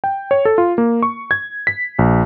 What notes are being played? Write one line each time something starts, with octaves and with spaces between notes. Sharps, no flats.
G5
C#5
A4
F4
A#3
C#6
G#6
B6
A#1